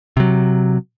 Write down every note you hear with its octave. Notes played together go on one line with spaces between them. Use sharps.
C3 F#3